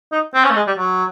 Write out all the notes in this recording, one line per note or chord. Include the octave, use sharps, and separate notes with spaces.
D#4
C4
C#4
A3
G#3
G3
F#3